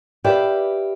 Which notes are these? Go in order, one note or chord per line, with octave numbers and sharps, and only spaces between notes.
G4 B4 D5 E5 F5